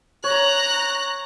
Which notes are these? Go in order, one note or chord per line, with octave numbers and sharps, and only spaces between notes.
C#5 A#5 F#6